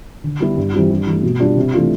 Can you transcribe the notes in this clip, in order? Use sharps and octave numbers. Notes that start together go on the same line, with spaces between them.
D3
G3 B3 E4
G2
E3 G3 C4 F4
G2
E3 A3
B2
G3 D4 F4
C3
E3 A3 D4 F4